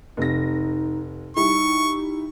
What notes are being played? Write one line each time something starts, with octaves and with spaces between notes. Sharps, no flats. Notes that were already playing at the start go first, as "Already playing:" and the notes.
F1 D#4 A#6
G3 D#4 E4 C#6